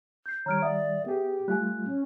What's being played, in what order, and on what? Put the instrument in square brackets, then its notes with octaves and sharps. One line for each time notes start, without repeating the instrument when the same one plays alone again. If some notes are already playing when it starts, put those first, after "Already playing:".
[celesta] G6 C7
[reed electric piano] D#3 G3 [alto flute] C#5 [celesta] A#5 F6 D7
[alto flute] D5 [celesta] E5 F#5 D#6
[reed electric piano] B3 G#4 [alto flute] G4
[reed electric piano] G3 A3 F4 [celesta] G#5 F#6
[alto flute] C#4